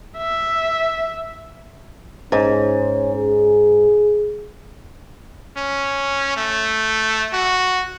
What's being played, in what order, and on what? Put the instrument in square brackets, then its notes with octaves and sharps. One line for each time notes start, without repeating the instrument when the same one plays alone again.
[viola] E5
[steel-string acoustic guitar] G#2 [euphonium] C#4
[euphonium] G#4
[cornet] C#4
A3
F#4